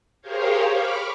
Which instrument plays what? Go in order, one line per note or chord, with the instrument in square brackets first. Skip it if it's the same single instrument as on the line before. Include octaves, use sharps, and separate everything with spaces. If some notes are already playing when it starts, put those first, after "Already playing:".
[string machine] G4 G#4 A#4 C5 C#5 F5
B5 C#6 D6 F6